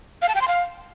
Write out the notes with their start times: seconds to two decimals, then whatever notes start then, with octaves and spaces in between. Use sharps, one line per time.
0.22 F5
0.28 A5
0.35 G5
0.41 C6
0.48 F5